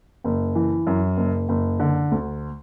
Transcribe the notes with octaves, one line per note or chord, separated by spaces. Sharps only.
F#1
E3
F#2
F#1
F#1
D3
D2